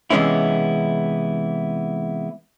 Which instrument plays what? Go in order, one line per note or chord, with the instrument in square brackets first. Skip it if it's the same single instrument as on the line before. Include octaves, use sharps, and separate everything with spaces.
[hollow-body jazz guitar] C3 E3 G#3 B3 C#4 E4